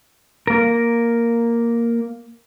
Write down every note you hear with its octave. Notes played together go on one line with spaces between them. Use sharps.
A#3 A#4